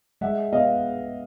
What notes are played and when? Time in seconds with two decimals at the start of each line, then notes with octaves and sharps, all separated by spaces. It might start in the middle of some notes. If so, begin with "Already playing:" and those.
0.21 G#3 E5 F#5
0.53 B3 D#5 F5